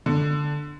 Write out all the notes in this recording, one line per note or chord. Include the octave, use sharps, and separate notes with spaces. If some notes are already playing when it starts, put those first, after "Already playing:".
D3